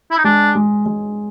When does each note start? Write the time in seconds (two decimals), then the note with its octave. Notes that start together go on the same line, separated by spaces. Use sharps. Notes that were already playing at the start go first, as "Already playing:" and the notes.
0.11 E4
0.18 D#4
0.24 G#3 D4
0.55 G#3
0.86 G#3